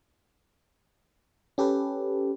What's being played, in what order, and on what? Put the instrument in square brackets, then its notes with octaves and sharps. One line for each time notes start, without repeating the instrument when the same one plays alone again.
[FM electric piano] C#4 G4 A4 B4